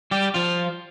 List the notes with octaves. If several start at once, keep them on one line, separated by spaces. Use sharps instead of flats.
G3 G4
F3 F4